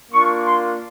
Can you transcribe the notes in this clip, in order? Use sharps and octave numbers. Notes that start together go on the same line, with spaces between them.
A#3 D4 F4 C#6
C6